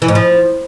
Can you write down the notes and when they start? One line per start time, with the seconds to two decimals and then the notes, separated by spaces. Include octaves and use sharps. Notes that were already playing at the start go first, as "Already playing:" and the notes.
0.02 E3
0.08 G#2
0.15 F3